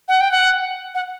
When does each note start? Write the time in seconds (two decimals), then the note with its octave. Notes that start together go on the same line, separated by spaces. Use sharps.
0.08 F#5
0.21 G5
0.32 F#5
0.95 F#5